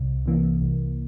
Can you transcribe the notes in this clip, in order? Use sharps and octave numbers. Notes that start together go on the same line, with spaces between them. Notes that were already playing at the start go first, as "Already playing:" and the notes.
Already playing: C2
C3 E3 A#3
C2